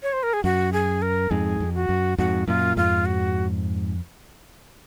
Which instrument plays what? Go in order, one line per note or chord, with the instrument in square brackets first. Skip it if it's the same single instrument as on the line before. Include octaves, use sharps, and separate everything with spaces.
[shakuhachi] C#5
C5
A#4
G#4
[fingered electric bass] F#2 [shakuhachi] F#4
[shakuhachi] G#4
A#4
[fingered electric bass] F2 G#2 [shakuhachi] G#4
[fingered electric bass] F2
[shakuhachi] F#4
[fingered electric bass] F#2
[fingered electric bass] F2 G#2 [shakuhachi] F#4
[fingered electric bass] F#2 A#2 [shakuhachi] F4
[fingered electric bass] F2 G#2 [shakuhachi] F4
[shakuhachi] F#4